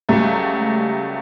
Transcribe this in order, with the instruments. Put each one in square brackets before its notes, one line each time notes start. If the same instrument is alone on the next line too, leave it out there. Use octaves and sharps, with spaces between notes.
[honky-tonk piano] C#2 F#3 G3 A3